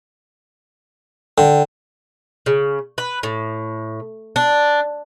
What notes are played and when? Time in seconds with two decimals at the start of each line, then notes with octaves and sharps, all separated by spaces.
1.38 D3 G5
2.46 C#3
2.98 B4
3.23 A2
4.36 D4